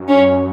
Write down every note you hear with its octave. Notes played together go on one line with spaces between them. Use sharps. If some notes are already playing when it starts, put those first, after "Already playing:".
Already playing: F#2
C#4